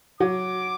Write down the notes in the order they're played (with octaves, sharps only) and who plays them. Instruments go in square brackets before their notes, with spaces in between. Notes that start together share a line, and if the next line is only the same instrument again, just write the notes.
[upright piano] F#3 [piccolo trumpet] D6